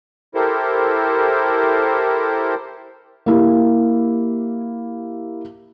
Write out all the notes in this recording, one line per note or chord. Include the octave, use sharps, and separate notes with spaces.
E4 G4 A4 A#4 C5
A#3 E4 G4